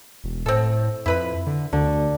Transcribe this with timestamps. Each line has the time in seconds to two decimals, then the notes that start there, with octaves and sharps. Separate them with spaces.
0.24 E1
0.46 A2 C4 A4
1.06 F2 E4 B4 B5
1.46 D3
1.73 D2 D3